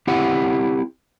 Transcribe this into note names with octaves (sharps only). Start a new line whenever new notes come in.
C4 E4 G4 F#5